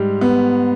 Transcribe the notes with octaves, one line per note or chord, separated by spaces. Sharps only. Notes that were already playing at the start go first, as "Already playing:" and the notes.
Already playing: G#2 G3
B3